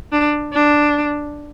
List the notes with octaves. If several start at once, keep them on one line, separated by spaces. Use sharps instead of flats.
D4
D4